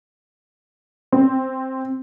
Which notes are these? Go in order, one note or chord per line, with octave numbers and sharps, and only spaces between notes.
C4